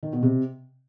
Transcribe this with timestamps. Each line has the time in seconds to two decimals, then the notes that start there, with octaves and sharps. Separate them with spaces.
0.03 D#3
0.13 B2
0.23 C3